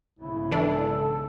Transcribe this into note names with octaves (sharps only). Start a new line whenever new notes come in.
B1 G#2 C#3 E4
E3 D4 A4